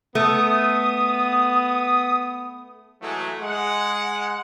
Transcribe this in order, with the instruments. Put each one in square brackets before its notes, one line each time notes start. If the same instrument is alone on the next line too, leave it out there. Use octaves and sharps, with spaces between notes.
[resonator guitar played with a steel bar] A3 [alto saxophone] B3 [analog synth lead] D#6
[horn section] E3 F#3 G#3 A3
G#3 F#5